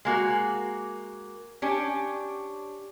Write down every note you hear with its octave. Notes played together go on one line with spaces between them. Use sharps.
G#3 A#3 F#4
C#4 D4 G4